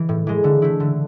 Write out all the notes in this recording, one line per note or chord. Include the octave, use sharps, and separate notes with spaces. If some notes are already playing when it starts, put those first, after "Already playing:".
Already playing: E3
A2
E3 G#3
D3
A3 E4
D3